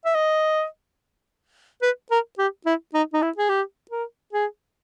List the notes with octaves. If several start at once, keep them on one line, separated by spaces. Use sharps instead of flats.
E5
D#5
B4
A#4
G4
E4
D#4
D#4
E4
G#4
G4
A#4
G#4